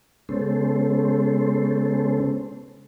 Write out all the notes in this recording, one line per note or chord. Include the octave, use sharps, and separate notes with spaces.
C#3 G#3 B3 C#4 A4 C5